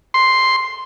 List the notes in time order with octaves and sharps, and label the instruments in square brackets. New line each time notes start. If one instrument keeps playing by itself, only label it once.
[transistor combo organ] C6